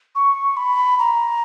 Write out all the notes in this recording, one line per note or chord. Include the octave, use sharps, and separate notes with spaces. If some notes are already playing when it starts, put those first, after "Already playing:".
C#6
B5
A#5